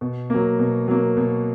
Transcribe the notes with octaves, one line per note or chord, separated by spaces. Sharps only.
B2
F#3 A#3
B2
F#3 A#3
B2